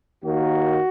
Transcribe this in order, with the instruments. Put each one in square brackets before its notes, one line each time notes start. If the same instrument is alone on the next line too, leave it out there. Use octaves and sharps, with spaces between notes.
[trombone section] D#2 D#3 A#3 F#4